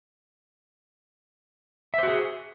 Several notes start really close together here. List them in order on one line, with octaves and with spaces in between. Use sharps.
E5 C5 F#4 G#4